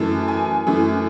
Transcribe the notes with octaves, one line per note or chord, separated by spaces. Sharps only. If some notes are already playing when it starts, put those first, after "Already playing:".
Already playing: F#2 E3 A3 A5
G#5
F#2 E3 A3